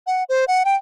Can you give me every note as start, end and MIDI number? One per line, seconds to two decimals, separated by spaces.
0.07 0.24 78
0.29 0.45 72
0.48 0.63 78
0.65 0.75 79